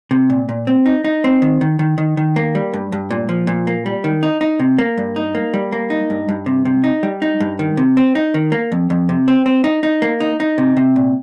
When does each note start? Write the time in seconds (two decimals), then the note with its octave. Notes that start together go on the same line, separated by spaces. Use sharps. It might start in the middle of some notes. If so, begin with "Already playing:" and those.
0.11 C3
0.30 A#2
0.49 A#2
0.67 C4
0.86 D#4
1.04 D#4
1.24 C4
1.42 D#3
1.61 D#3
1.79 D#3
1.98 D#3
2.17 D#3
2.36 A#3
2.55 G3
2.73 G2
2.92 G2
3.11 A#2
3.29 F3
3.47 A#2
3.67 A#3
3.86 G3
4.04 D#3
4.23 D#4
4.41 D#4
4.59 C3
4.78 A#3
4.98 G2
5.16 D#4
5.35 A#3
5.54 G3
5.72 A#3
5.90 D#4
6.10 G2
6.29 G2
6.46 C3
6.65 C3
6.84 D#4
7.03 G3
7.22 D#4
7.40 G2
7.59 D#3
7.77 C3
7.97 C4
8.15 D#4
8.34 D#3
8.52 A#3
8.72 F2
8.90 F2
9.09 C3
9.28 C4
9.46 C4
9.64 D#4
9.83 D#4
10.02 A#3
10.20 D#4
10.40 D#4
10.58 C3
10.77 C3
10.96 A#2